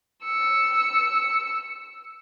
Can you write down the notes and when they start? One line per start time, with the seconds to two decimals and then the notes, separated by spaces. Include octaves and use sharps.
0.25 E6 C#7